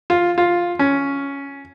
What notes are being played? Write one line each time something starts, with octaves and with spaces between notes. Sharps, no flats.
F4
F4
C#4